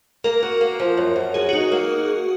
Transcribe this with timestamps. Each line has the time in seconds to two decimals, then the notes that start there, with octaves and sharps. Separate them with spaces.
0.24 A#3 A#4
0.43 F#4
0.61 A#3
0.80 F3
0.97 F#2
1.16 F#2
1.34 F#3 G#4
1.49 D#4 F#4
1.72 A#3